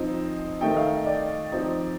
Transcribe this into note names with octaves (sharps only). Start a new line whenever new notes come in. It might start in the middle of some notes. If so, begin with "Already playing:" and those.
Already playing: F3 C4 D#4
D#3 A3 D#4 G5
F5
D#5
D5
F3 C4 D#4